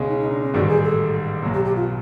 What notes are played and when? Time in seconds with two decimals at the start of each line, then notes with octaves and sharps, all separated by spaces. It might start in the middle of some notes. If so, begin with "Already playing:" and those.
Already playing: C#2 B2 G#3 C#4
0.09 D#4
0.20 D#4
0.31 D4
0.43 C#4
0.54 A1 G#2 D#3 G3 F#4
0.68 G#4
0.83 A4
1.43 B1 B2 F#3
1.54 G4
1.65 G4
1.76 F4